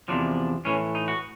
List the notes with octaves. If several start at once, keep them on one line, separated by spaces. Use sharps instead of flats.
E2 C3 F3 D4
A2 E3 C#4
D#4
F#4